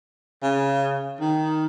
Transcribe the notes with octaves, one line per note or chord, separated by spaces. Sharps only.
C#3
D#3